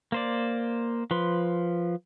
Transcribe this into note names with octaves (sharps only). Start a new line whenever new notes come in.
A#3 C5 D5
F3 B4 C6